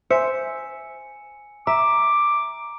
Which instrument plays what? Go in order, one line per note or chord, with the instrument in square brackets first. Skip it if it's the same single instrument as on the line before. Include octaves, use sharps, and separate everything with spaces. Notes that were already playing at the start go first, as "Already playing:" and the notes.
[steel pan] C5 [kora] E5 [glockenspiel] G#5 C#7
[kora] E5 [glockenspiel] A#5 [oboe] D6